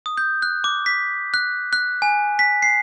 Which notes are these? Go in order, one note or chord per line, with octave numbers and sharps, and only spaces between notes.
D#6
G6
F#6
D6
B6
F#6
F#6
G#5
B6
C7